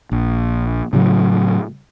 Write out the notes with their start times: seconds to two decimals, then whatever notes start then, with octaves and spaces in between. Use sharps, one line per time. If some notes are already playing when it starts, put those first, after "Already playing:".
0.11 A#1
0.93 A2 C#3 F#3